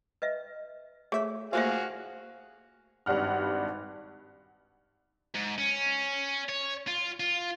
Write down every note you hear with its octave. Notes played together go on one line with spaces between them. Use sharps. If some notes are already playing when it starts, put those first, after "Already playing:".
B4 D#5 E5
A3 G#4 C#5 E5
A3 A#3 F4 F#4 G#4 C5 E5 F5
G#1 G2 G3 F#5 F6
G#2
C#4
C#5
F4
F4